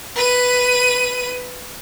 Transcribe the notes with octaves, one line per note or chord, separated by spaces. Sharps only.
B4 D#7